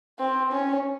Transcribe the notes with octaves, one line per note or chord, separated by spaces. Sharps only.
C4
C#4